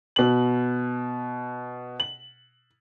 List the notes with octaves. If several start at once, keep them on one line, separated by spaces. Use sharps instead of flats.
B2 F#7
F#7